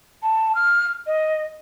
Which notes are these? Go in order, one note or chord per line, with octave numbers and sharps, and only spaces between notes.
A5
F6
D#5